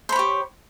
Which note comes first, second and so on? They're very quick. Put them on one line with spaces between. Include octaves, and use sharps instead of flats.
C5 B5 C#5 G4